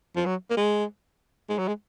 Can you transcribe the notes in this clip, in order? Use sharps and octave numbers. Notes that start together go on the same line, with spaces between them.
F3
F#3
A#3
G#3
G#3
F#3
G#3